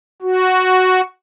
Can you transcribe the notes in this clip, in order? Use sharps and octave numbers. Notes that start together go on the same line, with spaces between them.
F#4